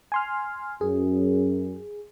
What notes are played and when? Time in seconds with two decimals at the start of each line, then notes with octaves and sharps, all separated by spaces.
0.12 G#5 C6 F6
0.81 F#2 G#4